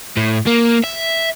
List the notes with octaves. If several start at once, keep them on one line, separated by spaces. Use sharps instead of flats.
A2
A#3
E5